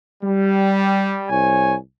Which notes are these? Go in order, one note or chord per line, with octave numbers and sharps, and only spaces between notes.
G3
C2 C#5 G#5